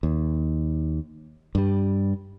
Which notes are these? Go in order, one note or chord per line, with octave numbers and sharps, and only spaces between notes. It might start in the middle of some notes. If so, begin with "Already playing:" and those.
D#2
G2 G3